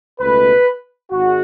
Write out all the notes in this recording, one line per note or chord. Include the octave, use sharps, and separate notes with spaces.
C#2 B2 A3 B4
G#1 G#2 F#4